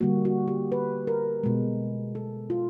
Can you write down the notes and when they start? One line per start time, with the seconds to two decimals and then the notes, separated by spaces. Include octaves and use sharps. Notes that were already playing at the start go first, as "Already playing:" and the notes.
0.01 D3 G3 A#3 F#4
0.25 F#4
0.48 G4
0.72 B4
1.07 A#4
1.43 B2 G#3
2.15 A4
2.50 F4